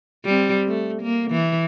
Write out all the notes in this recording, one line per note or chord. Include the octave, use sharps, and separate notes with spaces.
G3 C4
A3
A#3
E3